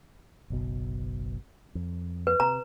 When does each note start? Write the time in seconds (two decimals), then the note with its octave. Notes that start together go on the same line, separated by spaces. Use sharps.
0.50 F#1 B1 B2
1.75 F2
2.27 B4
2.40 C3 A#5